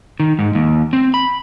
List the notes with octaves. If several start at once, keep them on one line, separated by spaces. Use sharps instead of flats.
D#3
G#2
D#2
C4
B5